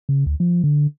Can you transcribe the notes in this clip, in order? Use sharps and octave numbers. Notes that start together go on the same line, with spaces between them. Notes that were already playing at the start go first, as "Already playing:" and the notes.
C#3
D2
F3
D3